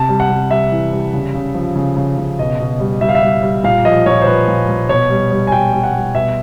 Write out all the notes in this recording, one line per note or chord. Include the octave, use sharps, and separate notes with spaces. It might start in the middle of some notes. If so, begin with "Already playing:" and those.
Already playing: C3 A5
G3
F#5
C3
G3 E5
E3
G3
C#3
C#3
F3
C#3
C#3
C#3
B2 D#5
B2
G3
G3 E5
F5
E5
G3
G3
A#2 F5
F3 D#5
A#2 C#5
C5
F3 B4
A#2
A#2
B2 C#5
G3
G3
G#5
B2 G5
G3
F#5
G3
B2 E5